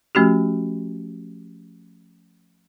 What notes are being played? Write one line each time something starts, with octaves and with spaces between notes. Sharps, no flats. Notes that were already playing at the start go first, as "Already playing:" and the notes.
F3 A3 C#4 F#4 G4